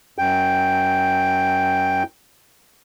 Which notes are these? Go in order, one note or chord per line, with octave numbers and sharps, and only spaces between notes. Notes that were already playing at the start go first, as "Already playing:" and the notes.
F#2 G5